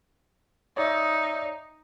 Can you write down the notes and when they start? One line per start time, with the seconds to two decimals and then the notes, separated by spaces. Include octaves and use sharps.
0.77 D#4 C#5 D5 E5